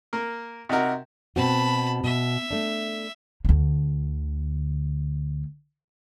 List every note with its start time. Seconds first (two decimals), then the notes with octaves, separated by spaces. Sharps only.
0.13 A#3 A#4
0.69 C3 D#4 F#4 A#4
1.36 B2 C4 F#4 A5 B5
2.04 B2 E5
2.51 A3 D4
3.45 D2 D3